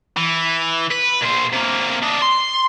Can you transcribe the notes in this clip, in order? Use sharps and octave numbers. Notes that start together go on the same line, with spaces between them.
E3
B4
A#2 C5
C3 A#3
D4 D#4
C6